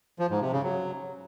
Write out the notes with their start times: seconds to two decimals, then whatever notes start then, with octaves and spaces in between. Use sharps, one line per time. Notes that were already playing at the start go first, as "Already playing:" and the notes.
0.19 F3
0.30 G#2
0.41 C3
0.52 C#3
0.63 F#3